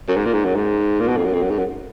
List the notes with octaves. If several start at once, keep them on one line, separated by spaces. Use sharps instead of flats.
F#2
G#2
A#2
G#2
F#2
G#2
A#2
B2
F2
F#2
F2
F#2
G#2
F#2